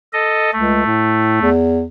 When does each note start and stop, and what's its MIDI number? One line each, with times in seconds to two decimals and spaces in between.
0.13 0.51 69
0.13 0.51 75
0.53 0.84 37
0.53 1.50 57
0.86 1.40 45
1.41 1.87 40